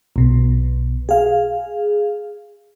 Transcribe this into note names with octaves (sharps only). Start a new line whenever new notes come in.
B1 B2
G#4 F5